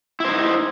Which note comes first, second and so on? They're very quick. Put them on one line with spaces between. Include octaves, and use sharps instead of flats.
E4 C5 D#4